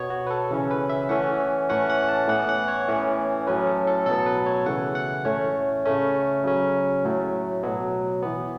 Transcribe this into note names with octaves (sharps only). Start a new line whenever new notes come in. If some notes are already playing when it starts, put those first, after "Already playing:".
Already playing: B2 B3 C#5
F#4
B4
A4
C#3 E3 C#4
B4
E5
E3 A3 C#4 F#5
A2 E3 A3 C#4 F#5
F#5
A5
A2 E3 B3 F#5
F#5
C#5
A2 E3 C#4
A2 F#3 C#4 B4
A4
A4
B2 F#3 B3 A4
B4
C#5
C#3 E3 A3 F#5
F#5
A2 A3 C#4 C#5
C#3 A3 C#4
C#3 F#3 C#4
A2 F#3 A3
B2 F#3 B3
E3 B3